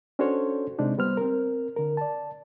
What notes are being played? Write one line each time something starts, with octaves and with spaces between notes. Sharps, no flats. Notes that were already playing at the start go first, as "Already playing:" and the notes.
C#4 D4 F#4 A4 C5 C#5
C3 G#3 C4 D4 D#4
G3 B3 C5 F6
C4 A#4
D3 A#4
D5 A5